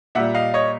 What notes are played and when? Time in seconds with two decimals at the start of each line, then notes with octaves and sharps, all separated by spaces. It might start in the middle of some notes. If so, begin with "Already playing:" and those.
0.15 A#2 G3 E5 F#5
0.35 D#5 F5
0.54 C#5 D#5